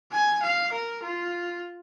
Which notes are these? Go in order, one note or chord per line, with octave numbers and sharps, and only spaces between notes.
G#5
F5
A#4
F4